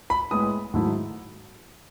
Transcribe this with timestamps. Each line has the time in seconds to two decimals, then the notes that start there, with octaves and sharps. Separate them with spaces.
0.10 B5
0.31 A2 G#3 B3 E4 D#6
0.74 G#2 D#3 F#3 A3 E4